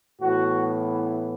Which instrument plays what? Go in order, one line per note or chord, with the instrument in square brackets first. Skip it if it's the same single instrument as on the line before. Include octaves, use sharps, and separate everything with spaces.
[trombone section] A2 E3 B3 F#4